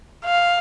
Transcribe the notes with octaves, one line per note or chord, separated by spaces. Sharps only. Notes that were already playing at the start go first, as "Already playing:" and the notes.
F5